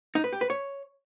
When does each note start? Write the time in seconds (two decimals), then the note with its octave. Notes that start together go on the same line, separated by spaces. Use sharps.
0.15 D#4
0.24 B4
0.33 G4
0.41 B4
0.50 C#5